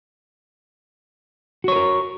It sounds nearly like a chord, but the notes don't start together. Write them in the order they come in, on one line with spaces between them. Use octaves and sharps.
F#4 C#5 B4 A#4